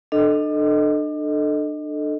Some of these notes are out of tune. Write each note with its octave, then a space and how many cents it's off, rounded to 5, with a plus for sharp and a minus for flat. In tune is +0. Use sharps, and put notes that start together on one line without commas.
D4 +30 A4 +0 D#5 +0